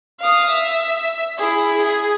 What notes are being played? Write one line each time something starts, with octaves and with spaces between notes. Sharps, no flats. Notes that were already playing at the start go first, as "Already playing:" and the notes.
F5 D#6
E5
E4 G#4
G#4